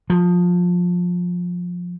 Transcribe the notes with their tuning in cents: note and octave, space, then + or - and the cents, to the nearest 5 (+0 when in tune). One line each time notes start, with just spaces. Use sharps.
F3 +20